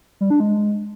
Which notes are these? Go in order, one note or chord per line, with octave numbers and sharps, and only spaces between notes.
G3
D4
G#3